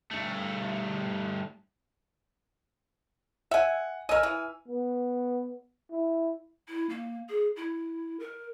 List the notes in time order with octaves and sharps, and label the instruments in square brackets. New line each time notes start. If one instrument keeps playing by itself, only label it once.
[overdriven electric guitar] G2 A3
[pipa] E5 G#5 [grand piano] F#5
[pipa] A#4 D#5 [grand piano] G#5 E6 F6
[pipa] E3
[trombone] B3
E4
[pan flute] E4
A#3
G#4
E4
A#4